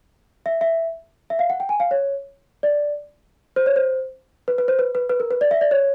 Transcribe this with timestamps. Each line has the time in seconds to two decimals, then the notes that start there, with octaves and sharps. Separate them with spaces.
0.46 E5
0.61 E5
1.30 E5
1.39 F5
1.50 F#5
1.60 G5
1.69 G#5
1.80 F5
1.91 C#5
2.63 D5
3.56 C5
3.66 C#5
3.76 C5
4.48 B4
4.58 B4
4.68 C5
4.79 B4
4.95 B4
5.09 B4
5.20 A#4
5.31 B4
5.41 D5
5.51 E5
5.61 D5
5.71 C#5